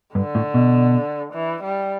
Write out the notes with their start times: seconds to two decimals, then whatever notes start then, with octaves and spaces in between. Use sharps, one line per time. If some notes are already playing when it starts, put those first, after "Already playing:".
0.15 G2 D3
0.35 A2
0.54 B2
1.33 E3
1.63 G3